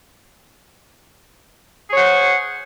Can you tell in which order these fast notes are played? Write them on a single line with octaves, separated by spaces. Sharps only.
G#4 C#5 F#5 C5